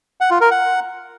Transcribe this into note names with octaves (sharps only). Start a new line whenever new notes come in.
F#5
F4
A#4
F#5